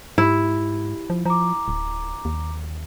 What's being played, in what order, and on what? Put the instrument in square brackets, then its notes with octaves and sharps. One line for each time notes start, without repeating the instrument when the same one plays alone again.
[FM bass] G#2 [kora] E4 [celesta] G4
[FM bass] F3
[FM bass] F3 [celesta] A#5 D6
[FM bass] D1
D#2